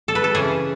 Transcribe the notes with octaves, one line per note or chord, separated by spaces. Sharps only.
A4
B4
A4
C#3 E3 A3 C#4 G#4